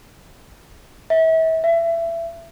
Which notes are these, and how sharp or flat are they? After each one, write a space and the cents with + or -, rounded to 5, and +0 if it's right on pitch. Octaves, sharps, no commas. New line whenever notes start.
E5 -35
E5 +25